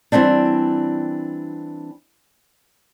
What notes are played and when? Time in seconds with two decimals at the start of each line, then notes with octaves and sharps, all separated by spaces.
0.12 E3 G3 A3 C4 D4